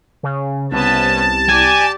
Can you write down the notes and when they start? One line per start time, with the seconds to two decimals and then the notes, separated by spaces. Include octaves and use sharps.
0.23 C#3
0.72 C2 B3 C#4 A5
1.49 G4 D5 G#5